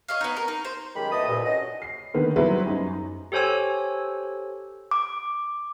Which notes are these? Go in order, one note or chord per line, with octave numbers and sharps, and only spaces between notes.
C#5 D#5 F5
B3 D#4
A#4
D#4
C5
F#2 D#3 G#3 G4 B5
D2 A3 B3 D#5 A5 D#6
C2 G2 A#2
C#4 D#4 F#4 D#5
C7
D3 D#3 B3 B4
F#3 G3 B3 E4 B4 C5
F#2 D#4
G4 A4 C5 C#5 G#5 E6
D6